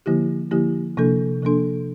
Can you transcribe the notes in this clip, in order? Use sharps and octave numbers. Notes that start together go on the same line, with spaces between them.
D3 F3 A#3 E4 G4
D3 F3 A#3 E4 G4
C3 F3 A#3 D4 A4
C3 F3 A#3 D4 A4